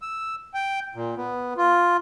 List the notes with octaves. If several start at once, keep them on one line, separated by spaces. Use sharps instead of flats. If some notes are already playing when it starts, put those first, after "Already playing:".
E6
G5
A#2
B3
F4